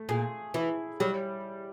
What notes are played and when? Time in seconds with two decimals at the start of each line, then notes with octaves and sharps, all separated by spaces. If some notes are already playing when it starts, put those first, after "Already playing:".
Already playing: A3
0.09 A#2 G#4
0.54 E3 E4
1.00 F#3 G3